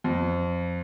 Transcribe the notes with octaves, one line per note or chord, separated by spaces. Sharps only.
F2